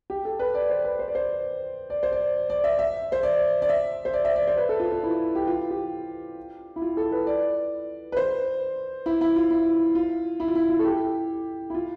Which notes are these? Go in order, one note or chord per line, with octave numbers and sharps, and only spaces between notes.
G4
A4
B4
D5
C5
B4
C5
D5
C5
D5
C5
D5
D5
E5
E5
C5
D5
D5
E5
C5
D5
E5
D5
C5
B4
A4
F4
F4
E4
G4
F4
G4
E4
F4
A4
B4
D5
B4
C5
E4
E4
F4
E4
F4
E4
F4
E4
F4
A4
G4
E4
F4